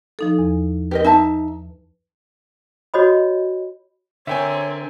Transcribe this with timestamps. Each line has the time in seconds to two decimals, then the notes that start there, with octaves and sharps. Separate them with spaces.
0.19 F3 D#4 A4
0.39 E2
0.91 G4 A#4 B4 D#5
1.05 D#4 E5 G#5 A5
2.94 F#4 C#5 D#5 B5
4.27 D3 C4 A#4 C#5 E5 G5 G#5